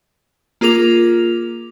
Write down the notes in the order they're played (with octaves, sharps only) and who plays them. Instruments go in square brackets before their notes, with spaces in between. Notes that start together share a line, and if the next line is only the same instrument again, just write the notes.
[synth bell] A#3 F4 G#4 A#4 D6 F7